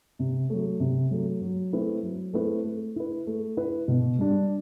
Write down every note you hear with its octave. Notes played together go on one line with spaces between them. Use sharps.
C3
F#3 A3
C3
F#3 A3
F#3
A3 C4 E4 B4
F#3
A3 C4 E4 B4
A3
E4 B4
A3
E4 B4
B2
G3 D4